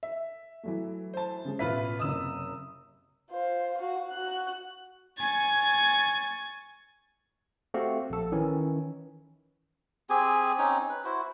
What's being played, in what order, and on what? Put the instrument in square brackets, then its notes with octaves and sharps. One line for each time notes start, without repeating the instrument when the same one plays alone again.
[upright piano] E5
[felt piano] E3 F#3 A3
[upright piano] C5 A5
[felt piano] C#3 G#3
[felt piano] A1 B2 B6 [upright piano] F4 B4 E5
[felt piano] F#1 C3 D#5 [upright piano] D#6 E6
[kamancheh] F4 C5
F#4 F5
F#4 F#6
[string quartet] G#5 C#6 G#6 A6
[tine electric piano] A3 C4 F#4 G4 F5
A#1 A4
D#3 E3 C#4
[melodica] C4 G4 G#4 G#5
C4 C#4 D#4 C#5
B4
E4 F#4 C5